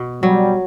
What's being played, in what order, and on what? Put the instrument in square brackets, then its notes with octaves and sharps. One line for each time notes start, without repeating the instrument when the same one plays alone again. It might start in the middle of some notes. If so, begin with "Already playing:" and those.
Already playing: [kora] B2
[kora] F#3 [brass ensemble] G3